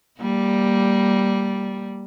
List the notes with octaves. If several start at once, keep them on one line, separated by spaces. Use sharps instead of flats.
G3 A#3